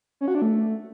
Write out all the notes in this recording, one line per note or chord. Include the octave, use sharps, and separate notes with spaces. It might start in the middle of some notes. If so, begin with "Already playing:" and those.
C#4
F#4
D4
A3